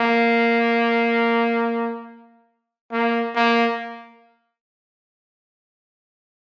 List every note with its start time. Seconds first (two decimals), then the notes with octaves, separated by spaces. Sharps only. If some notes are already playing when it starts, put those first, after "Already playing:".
Already playing: A#3
2.92 A#3
3.36 A#3